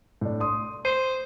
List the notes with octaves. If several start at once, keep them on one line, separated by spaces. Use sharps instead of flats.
A2 D4
C6 D#6
C5 D#7